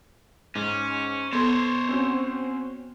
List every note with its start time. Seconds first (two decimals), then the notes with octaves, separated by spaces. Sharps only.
0.55 G#2 C#4
1.33 B3 A4 C5 C#5 C6
1.89 C4 C#4 F#4